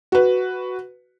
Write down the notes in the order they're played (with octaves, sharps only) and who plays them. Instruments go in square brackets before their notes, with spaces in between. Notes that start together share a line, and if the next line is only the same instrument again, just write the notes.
[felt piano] F#4 B4